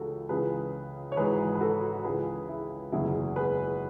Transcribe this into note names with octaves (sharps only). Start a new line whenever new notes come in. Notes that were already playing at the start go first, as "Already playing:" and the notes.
Already playing: C#2 C#3 E3 F#4 G#4 A4
C#2 C#3 E3 G#4 B4
C#5
G#1 G#2 E3 G#4 B4
B4
F#4 A4
C#2 C#3 E3 G#4 B4
E4 G#4
F#1 E2 B2 E4 G#4
G#4 B4